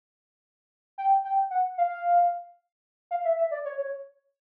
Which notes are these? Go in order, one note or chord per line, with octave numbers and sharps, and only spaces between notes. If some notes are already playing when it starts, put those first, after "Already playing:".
G5
G5
F#5
F5
F5
E5
E5
D5
C#5
C#5